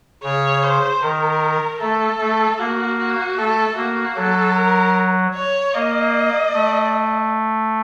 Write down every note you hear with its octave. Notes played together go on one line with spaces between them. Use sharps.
C#3 C#5
C5
D#3 A#4
A3 A4
A3
A#3 F#4
F#4
A3 A4
A#3 F#4
F#3 A4
A#4
C#5
A#3 D#5
A3